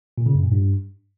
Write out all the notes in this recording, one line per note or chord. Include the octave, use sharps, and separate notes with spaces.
A#2
C#3
F#2
A#2
G2